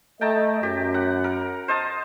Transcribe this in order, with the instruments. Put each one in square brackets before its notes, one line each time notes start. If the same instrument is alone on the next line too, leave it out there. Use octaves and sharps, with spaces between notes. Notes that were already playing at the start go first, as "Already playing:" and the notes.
[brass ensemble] A3 D#5 [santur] G5 A5 A#5
[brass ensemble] F#2 [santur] G4
[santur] F#5
A#4
C5 D#5 A5